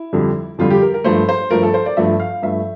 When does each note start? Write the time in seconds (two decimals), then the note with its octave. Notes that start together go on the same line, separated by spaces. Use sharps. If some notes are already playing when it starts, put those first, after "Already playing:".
Already playing: E4
0.13 F2 D3 G3
0.58 F2 D3 G3 F4
0.71 G4
0.82 A#4
0.94 A#4
1.04 G2 F3 A3 C5
1.29 C5
1.51 G2 F3 A3 A#4
1.63 A4
1.74 C5
1.86 D5
1.97 G2 F3 A3 E5
2.20 F5
2.42 G2 F3 A3 E5